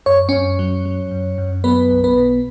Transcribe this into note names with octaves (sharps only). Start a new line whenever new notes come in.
F#2 C#5
F#2 C#4 C#5
F#3
F#3
F#2
F#2
F#3 B3 B4
B1
B3 B4
B2